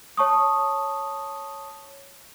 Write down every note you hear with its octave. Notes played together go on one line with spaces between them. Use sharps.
C#5 A5 C#6 D#6